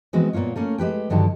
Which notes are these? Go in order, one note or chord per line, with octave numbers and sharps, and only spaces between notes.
E3 G#3 B3 C4 F#4
A#2 A#3 B3 F4 C#5
A3 A#3 C#4
G#3 G4 B4 G5
G2 D3 D#3 F#3 G4 A5